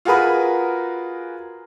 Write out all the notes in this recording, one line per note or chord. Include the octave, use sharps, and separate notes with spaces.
F4 F#4 G#4 A#4 B4 D#6